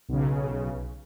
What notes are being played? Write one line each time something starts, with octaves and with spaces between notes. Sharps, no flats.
B1 C#3